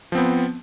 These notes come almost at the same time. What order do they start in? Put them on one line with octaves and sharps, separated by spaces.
F3 C4 B3